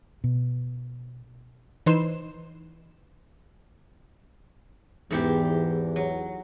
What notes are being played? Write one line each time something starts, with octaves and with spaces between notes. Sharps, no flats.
B2
E3 D#4 B4 C5 C6 E7
E2 G#2 E3 G4
F#3